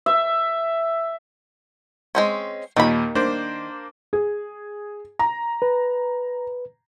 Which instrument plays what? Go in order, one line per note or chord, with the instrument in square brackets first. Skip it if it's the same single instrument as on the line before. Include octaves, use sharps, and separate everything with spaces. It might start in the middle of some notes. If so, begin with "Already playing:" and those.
[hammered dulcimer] E5
[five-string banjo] G#3 C4 C#4
[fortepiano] D#2 A#2 [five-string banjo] D#3 B5
[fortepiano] A#3 D4 C5
[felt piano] G#4
A#5
[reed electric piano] B4